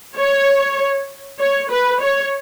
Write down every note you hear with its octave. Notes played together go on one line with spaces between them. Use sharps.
C#5
C#5
B4
C#5